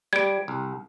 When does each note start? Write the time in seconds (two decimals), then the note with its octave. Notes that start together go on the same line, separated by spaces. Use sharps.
0.13 G3 G#6 D7
0.48 C2